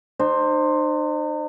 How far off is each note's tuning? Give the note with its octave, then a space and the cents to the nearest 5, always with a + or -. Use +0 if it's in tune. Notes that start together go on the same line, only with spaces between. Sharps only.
D#4 -45 C5 +10